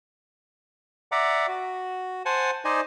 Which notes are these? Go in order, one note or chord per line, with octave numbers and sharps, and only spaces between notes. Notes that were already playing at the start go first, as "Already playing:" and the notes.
D5 E5 F#5 A#5 D6
F#4
C5 F#5 G#5 A5
D#4 C5 D5 D#5 G#5